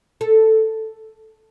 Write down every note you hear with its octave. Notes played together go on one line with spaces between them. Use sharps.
A4